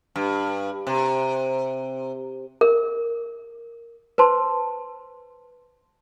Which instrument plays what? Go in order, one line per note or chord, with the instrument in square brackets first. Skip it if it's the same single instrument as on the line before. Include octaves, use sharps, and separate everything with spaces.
[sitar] G2
C3
[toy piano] A#4
[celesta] B4 C5 A5 C6